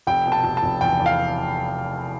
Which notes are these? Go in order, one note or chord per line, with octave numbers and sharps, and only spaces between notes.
F1 G5
B2
A5
F1
A5
F1
E2 G5
E2
F5